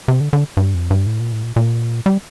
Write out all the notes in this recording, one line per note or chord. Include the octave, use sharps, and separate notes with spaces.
C3
D3
D3
G2
F2
G2
A2
A#2
A2
A#2
A#2
G3